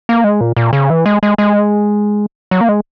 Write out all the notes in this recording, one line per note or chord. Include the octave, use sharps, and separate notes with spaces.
A#3
G#3
A#2
A#2
C#3
E3
G#3
G#3
G#3
F#3
A#3
G#3